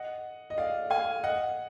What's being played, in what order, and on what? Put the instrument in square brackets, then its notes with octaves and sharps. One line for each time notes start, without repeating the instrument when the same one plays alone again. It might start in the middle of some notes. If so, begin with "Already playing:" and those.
Already playing: [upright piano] D#5 F#5
D#5
D5 F5
F5 G#5
D#5 F#5